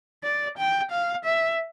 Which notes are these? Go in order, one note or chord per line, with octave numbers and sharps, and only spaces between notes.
D5
G5
F5
E5